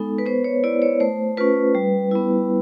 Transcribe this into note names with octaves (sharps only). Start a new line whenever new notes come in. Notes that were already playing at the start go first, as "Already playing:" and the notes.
Already playing: G#3 B3 D#4 A4
B4
B3 C5
C#5
E4 D5
C#5
A3 C5
C#4 F4 B4
G3
B3 E4